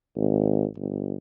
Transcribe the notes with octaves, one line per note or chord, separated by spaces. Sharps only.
G#1
G1